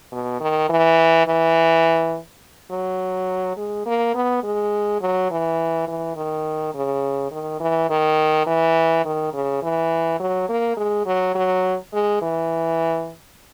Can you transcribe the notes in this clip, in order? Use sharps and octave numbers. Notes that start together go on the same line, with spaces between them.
B2
D#3
E3
E3
F#3
G#3
A#3
B3
G#3
F#3
E3
E3
D#3
C#3
D#3
E3
D#3
E3
D#3
C#3
E3
F#3
A#3
G#3
F#3
F#3
G#3
E3